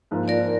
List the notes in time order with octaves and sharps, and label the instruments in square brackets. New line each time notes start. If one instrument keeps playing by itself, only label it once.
[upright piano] G#2 F3 A#3
[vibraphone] A#4 D5